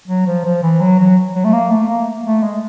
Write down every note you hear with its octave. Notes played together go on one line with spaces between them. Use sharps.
F#3
F3
F3
E3
F#3
F#3
F#3
A3
A#3
A3
A#3
A3
G#3